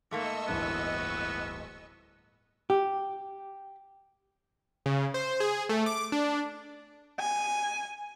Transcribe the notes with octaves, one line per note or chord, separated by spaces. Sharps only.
G#2 A3 A#3 D#5 C#6 E6
D1 G1 E3 B3
G4
C#3
C5
G#4
A3
D6
D4
G#5